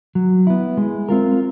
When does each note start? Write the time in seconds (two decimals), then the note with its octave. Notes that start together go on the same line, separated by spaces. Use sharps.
0.15 F#3
0.47 B3 E4
0.77 G#3
1.09 C4 F4 A#4